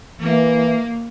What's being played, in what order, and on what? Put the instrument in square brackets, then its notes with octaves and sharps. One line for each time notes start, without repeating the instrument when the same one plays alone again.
[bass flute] E3 [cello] A#3